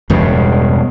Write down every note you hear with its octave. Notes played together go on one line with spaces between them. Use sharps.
E1 E2 G2 C#3